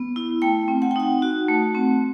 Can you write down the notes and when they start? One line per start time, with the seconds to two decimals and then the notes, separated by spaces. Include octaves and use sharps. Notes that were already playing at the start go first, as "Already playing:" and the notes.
Already playing: B3
0.16 E4
0.42 A3 G5
0.68 C4
0.82 F#5
0.91 G5
0.96 D#4 F#5
1.22 F#4
1.48 A3
1.75 C4